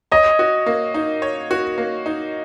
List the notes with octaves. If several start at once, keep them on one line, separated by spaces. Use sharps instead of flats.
C#5 D#5
F#4
A#3
D#4
C#5
F#4
A#3
D#4